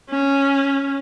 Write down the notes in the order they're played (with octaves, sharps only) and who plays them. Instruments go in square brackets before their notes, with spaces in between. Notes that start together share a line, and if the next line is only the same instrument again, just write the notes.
[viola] C#4